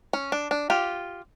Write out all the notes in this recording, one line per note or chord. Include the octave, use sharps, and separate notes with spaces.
C#4
D4
D4
F4 G4